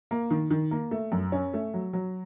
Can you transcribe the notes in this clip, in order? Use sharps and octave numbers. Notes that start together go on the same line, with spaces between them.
A#3
D#3
D#3
A#3
A3
F#2
C#4
A3
F#3
F#3